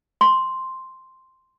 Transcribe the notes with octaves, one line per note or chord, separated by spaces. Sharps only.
C6